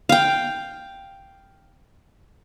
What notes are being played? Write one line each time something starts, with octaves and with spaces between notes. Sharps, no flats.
F5 G5